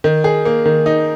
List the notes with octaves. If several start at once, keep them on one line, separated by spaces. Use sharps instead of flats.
D#3
G#4
A#3
D#3
D#4